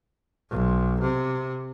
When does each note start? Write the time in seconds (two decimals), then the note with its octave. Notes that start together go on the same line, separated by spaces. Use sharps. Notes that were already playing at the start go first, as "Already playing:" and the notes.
0.51 B1
1.01 C3